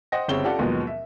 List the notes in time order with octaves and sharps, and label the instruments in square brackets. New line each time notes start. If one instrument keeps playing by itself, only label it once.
[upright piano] C5 D#5 F#5 G5 A#6
G1 C#3 C4 G4 C#5 G7
F4 G4 A4 D5 F#5
D#2 G#2 B2 F3 F#3 B3
E5